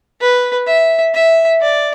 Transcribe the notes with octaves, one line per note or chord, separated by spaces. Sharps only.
B4
E5
E5
D5